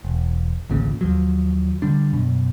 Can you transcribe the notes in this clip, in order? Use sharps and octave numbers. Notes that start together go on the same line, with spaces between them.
E1
A1 D2 A#2 C#3
D#2 F3 F#3
D3 G3 D4
F#2 B2